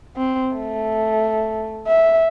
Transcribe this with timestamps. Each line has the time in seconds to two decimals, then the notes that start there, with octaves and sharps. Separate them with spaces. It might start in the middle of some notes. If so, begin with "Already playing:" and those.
0.16 C4
0.55 A3
1.87 E5